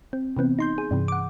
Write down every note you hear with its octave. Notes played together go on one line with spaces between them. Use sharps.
C4
C3 E3 B3 C4
D#4 C6 G6
G#4
G2 C3 E3
F#5 D6